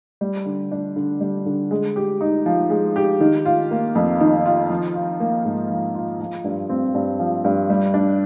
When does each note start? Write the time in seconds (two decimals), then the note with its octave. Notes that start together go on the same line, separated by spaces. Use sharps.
0.21 G3
0.46 D3
0.71 D4
0.96 D3
1.21 G3
1.46 D3
1.71 G#3
1.96 G4
2.21 D#4
2.46 F3
2.70 G#3
2.96 G4
3.20 D#3
3.45 F4
3.71 A#3
3.95 F2
4.20 D#3
4.46 F4
4.70 F3
4.95 F4
5.20 A#3
5.45 G#2
5.70 F3
5.95 F4
6.20 F3
6.44 G2
6.70 C4
6.94 G2
7.19 F3
7.44 G2
7.70 G3
7.94 D4